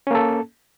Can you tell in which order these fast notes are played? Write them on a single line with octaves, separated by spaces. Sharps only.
C#4 A#3 A4